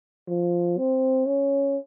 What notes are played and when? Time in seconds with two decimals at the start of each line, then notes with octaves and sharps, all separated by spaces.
0.28 F3
0.78 C4
1.26 C#4